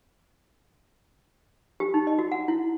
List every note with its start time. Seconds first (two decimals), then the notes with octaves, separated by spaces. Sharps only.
1.80 G4
1.94 D#4
2.07 D#5
2.19 F#4
2.32 F#5
2.48 E4